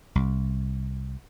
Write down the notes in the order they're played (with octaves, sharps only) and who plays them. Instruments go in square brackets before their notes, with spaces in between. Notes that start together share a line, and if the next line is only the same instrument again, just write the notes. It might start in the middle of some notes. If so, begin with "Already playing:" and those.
[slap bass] C2